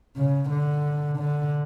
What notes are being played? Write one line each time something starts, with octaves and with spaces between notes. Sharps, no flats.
C#3
D3
D3